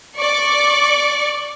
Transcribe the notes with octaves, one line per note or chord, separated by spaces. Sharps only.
D5 C#6 D6